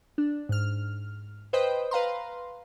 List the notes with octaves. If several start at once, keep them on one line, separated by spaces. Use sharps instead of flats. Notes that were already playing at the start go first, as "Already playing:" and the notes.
D4
G#2 F6
B4 C5 D#5 G5
B4 F5 A#5 C6